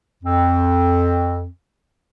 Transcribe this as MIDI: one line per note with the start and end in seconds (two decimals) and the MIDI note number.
0.23 1.47 41
0.23 1.47 60